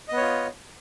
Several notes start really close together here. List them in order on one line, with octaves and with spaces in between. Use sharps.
D#5 B3 C#5 F4